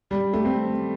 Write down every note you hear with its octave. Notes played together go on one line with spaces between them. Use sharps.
G3
A3
C4